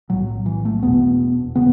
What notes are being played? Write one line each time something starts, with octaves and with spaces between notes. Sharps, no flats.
B1 A2 F#3
E3
A3
E1 E2 B2 B3
C#3 B3